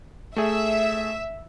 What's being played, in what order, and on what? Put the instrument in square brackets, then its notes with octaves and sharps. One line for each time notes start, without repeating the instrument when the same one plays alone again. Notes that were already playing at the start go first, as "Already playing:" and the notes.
[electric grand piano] A3 G#4 [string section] E5